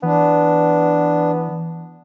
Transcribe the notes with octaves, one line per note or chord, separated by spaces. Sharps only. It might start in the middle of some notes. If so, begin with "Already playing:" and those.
E3 B3 D4